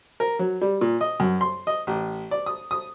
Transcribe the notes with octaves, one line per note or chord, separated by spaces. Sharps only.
A#4
F#3
G3
A#2
D#5
F#2
C6
D#5
A1
D5
D#6
D#6